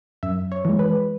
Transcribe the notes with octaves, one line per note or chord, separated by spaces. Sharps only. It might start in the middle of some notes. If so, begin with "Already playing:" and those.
F#2 E5
C#5
E3 G#3
B4